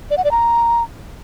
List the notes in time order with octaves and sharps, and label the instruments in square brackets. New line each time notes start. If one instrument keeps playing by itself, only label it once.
[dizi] D5
F#5
D5
A#5